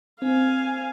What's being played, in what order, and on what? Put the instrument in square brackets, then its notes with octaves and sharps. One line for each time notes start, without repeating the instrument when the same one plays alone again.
[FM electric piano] C4 [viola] F5 G#5